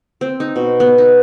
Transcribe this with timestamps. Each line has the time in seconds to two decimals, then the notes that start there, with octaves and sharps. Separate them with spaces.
0.21 C4
0.40 D#4
0.56 B2
0.80 B3
0.98 D#4